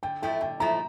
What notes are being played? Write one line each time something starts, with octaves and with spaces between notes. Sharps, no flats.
D3 G5
F3 A3 E4 G5
D3 G5
F3 A3 E4 A#5